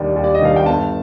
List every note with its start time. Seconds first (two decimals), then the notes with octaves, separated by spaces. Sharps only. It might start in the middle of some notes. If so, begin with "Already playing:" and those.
Already playing: D#2 D#3 G3 D4
0.16 D#2
0.24 D5
0.34 D#5
0.41 D#3 G3 D4 F5
0.56 G5
0.66 G1 A5